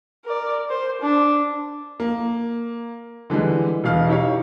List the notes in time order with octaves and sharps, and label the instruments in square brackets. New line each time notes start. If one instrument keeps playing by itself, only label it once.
[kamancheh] A#4 D5
C5
D4
[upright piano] A#3
D3 E3 G3 G#3
E1 B2 F5 F6
D#4 E4 G4 C#5 F5